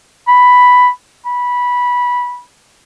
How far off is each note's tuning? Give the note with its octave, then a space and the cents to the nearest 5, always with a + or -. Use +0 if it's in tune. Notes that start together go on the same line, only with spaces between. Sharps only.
B5 +5
B5 -15